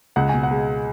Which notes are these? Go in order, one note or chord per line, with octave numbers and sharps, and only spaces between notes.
C#2 F#5
B2 G#5
F#5
G#3